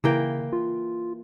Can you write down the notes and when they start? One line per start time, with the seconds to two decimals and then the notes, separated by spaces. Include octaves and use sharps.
0.04 C#3 E3 A#3 G5
0.53 F4